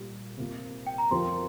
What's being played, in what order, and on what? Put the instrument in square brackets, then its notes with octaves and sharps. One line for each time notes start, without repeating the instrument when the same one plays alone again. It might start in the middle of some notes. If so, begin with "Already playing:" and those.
Already playing: [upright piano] A#2 G3 A#3 G4
C3 A#3 F4
[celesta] G5
A#5
[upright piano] F2 F3 C4 G4 A#4 [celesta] C6